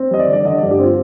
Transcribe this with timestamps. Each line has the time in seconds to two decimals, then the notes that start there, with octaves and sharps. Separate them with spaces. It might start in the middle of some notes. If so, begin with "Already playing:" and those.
Already playing: C4
0.11 G3 D#5
0.19 D5
0.28 D3
0.33 D5
0.45 D3 D#5
0.58 G2 D5
0.71 G4
0.79 C4 F4